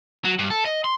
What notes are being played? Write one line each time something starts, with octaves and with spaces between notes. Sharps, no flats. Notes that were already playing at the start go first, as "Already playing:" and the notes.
F#3
G2
A4
D#5
C6